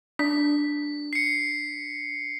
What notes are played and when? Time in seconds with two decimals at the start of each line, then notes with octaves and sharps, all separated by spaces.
0.19 D4 B6
1.13 C7 C#7